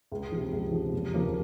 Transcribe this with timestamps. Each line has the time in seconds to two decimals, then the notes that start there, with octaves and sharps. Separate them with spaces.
0.12 C#2
0.32 C3 F3
0.53 C#2
0.72 C3 F3
0.93 F1
1.14 D#2 C#3 F3 A#3